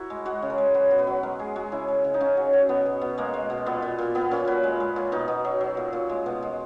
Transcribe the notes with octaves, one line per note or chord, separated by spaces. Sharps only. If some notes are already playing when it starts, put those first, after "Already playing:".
Already playing: E4 F#4 A#4
G#3
G#3 F#4
C#3
A#4
G#3
F#3 B4
B2
B4
F#3
G#3 A#4
G#3 G#4
G#3 F#4
C#3 E4
G#3
C#3
D#4
C#3 C#4
F#3
F#3
B2 B3
B2
B2
G#3 A#3
G#3
B2
A#2 B3
A#2
A#2
A#2 B3
A#2 C#4
F#3 B4
G#3
G#3
A#2
B2 D#4
B2
F#3
F#3
A#2
A#2
G#3
B2
G#3